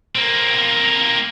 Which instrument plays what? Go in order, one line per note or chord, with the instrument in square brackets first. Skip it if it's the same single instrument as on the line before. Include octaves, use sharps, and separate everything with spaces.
[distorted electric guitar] A#3 C4